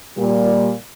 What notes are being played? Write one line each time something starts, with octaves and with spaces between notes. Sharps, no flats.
A#2 G3